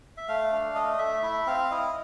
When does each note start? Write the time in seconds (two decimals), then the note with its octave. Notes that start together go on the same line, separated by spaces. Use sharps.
0.17 E5
0.28 A3 F5
0.52 D4
0.75 A3 D#5
0.99 A3 E5
1.23 E4 E5
1.47 C4 F5
1.71 E4 D#5